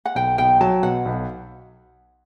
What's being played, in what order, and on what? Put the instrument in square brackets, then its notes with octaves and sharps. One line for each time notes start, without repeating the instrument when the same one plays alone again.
[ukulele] F#5
[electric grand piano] B1 [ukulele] G5
[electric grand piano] B1 [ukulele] G5
[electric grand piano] F#3 [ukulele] A5
[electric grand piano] B2 [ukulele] F#5
[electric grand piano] B1